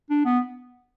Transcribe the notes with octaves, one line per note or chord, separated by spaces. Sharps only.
D4
B3